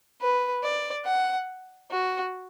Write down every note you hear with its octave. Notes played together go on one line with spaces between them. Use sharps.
B4
D5
F#5
F#4